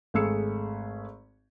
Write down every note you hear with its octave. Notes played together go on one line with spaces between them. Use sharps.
G#1 A3 G#4 E6 C#7